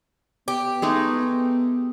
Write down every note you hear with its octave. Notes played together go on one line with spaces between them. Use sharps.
B3 G4
G#3 A3 D#4